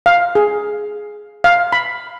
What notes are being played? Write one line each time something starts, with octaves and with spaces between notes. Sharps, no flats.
F5
G#4
F5
B5